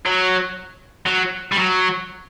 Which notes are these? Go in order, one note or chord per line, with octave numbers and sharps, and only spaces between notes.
F#3
F#3
G3
F#3